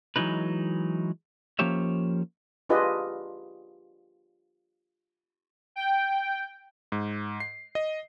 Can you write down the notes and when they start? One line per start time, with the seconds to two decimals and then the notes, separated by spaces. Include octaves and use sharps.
0.16 E3 F#3 G#3 D#4 B4
1.59 F3 A#3 C#4 G4 C#5 E5
2.69 D4 F4 G4 G#4 B4 D#5
5.76 G5
6.92 G#2
7.40 C7
7.75 D#5